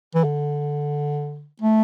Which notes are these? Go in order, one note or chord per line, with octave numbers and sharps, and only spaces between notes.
E3
D3
A3